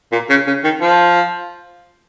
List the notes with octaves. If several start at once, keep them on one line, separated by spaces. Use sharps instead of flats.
A#2
C#3
C#3
D#3
F3